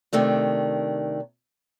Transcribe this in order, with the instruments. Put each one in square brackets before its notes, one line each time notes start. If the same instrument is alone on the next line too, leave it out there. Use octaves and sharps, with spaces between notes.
[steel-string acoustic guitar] C3 D#3 A3 D4